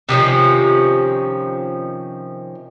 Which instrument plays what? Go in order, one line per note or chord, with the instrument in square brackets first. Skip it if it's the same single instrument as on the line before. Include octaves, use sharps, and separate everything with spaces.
[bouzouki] C3 D#3 F3 C#4